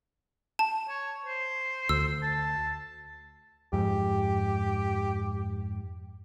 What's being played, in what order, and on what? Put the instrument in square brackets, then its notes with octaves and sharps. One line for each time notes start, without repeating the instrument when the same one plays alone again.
[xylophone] A5
[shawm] C#5
C5
[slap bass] D2 [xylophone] E6
[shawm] A5
[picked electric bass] F2 G#2 [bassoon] G4